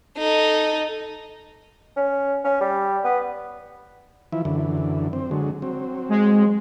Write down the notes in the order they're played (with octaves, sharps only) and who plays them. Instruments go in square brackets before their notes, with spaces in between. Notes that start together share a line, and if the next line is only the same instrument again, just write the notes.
[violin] D#4 A4
[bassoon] C#4
C#4
G3
B3
[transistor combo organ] E3 F3 E4
F#2 D3 E3
C4
D3 F#3 G#3
F#3 C4
[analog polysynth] G#3